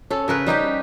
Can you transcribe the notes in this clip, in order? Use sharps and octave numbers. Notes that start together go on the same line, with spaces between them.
C#4 A4
C#3 A#4 B4
G3 D#4 G4 G5